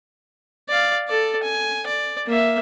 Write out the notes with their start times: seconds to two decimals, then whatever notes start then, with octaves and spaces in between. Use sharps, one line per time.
0.69 D5 F5
1.07 A4 D5
1.43 G#5
1.87 D5
2.27 A#3 E5